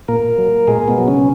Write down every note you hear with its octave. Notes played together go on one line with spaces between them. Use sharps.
A#2 A#3 A#4
F#3
A#2 G#3 G#4
B2 B3
F#3
C#3 C#4